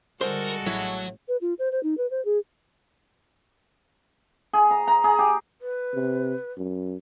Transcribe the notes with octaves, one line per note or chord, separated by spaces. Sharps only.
D3 G3 G#3 F#4 A4 A#4 C5
A1 F#3 E4 C#5 F#5
B4
F4
C5
C5
D#4
B4
C5
G#4
G#4
A#5
A#5
G#4
G4
B4
C3
F#2